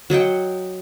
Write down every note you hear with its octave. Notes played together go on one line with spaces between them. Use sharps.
F#3 D#5 F#5 G5